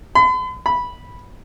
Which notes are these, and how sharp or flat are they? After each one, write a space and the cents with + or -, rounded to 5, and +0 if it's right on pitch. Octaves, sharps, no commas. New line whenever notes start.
B5 +45
B5 -10